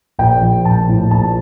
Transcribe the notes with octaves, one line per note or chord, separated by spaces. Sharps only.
A#1 G5
F3
A#1 A5
A2
A#1 A5